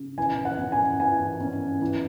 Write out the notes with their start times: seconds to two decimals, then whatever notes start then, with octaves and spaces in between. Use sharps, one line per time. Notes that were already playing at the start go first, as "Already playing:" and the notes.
Already playing: C#3
0.18 E3 G#5
0.45 F#5
0.59 C#4
0.72 G#5
1.00 E3 G#5
1.41 C#4
1.81 E3